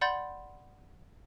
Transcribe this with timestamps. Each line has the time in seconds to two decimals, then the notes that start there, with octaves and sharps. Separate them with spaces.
0.01 D5 F#5 B5 C6 G6 A6